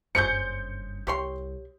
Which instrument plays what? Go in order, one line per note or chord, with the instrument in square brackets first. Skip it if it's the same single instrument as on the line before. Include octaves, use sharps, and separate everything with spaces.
[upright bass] F#1 G2 [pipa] C#4 G#4 C5 [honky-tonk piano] G6 C#7
[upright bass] C2 [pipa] G4 C#5 C6